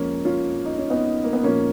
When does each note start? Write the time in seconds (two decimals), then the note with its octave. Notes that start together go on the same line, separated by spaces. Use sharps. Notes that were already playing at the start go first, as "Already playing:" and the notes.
Already playing: F2 F3 G#3 A#3 C#4
0.25 C#4 F4
0.65 D#4
0.78 C#4
0.90 B3 D#4
1.24 A#3
1.33 B3
1.44 A#2 F3 G#3 A#3 C#4